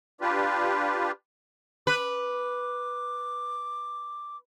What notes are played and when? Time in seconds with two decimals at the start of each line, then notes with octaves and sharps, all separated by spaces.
0.21 D4 F4 G4 B4
1.87 B4 D6